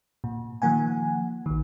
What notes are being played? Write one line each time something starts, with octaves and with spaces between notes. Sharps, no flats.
A#2
D#3 F3 A#3 F#5 G#5
A#1 D#3